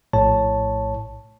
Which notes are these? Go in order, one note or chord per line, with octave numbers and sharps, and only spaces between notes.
A#1 A2 C#5 A5